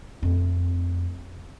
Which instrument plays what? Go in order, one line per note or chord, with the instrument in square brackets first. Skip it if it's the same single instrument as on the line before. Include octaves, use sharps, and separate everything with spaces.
[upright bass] F2 A3